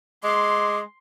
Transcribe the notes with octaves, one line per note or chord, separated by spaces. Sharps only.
G#3 C6 D6